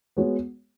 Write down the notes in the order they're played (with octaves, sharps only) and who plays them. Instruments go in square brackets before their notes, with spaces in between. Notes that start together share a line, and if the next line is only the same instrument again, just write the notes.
[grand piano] G#3 B3 F#4 C#5